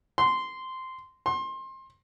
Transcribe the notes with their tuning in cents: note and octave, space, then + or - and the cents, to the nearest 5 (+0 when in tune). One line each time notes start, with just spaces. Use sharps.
C6 -10
C6 +25